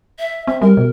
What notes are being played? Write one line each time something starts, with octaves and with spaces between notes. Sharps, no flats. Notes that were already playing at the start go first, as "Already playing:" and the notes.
E5
C4 E5
G3 A#4
B2